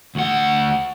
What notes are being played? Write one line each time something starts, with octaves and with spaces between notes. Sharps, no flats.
D2 F#5